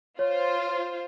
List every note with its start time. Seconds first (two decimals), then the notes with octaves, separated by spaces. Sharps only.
0.19 F4 C5 C#5